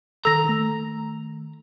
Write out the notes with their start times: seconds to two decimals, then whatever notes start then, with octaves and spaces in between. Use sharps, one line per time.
0.25 D#3 A4 A#5 E6 A#6
0.44 D#3 A3